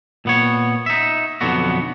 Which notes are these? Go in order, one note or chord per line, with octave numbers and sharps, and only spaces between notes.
A#2 B3 C#5
D#4 E5
B1 F2 D3 B3 F#4